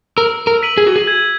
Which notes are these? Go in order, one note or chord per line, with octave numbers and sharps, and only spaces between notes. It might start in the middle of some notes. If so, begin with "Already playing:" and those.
A#4 E6
A#4
B6 D#7 F#7
G#4
F#4
G#4
G#6